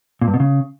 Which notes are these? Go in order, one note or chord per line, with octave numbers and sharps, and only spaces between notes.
A#2
G2
B2
C#3